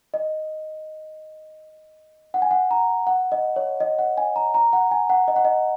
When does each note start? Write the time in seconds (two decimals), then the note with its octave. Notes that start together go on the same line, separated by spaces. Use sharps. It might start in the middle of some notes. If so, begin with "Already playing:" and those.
0.14 D#5
2.34 F#5
2.42 G#5
2.51 F#5
2.71 A#5
3.07 F#5
3.32 D#5
3.56 C#5
3.80 D#5
3.99 F#5
4.17 G#5
4.36 A#5
4.54 A#5
4.73 F#5
4.91 G#5
5.10 F#5
5.28 D#5
5.36 F#5
5.45 D#5